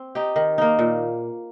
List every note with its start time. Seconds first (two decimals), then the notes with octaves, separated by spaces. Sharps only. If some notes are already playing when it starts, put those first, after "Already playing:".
Already playing: C4
0.15 D#4 G4
0.36 D#3
0.58 A#3 D#4
0.79 A#2